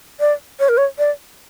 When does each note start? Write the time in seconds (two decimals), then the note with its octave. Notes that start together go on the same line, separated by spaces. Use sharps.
0.20 D5
0.59 C#5
0.69 A#4
0.77 C#5
0.98 D5